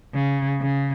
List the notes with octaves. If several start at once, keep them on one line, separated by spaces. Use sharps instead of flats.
C#3
C#3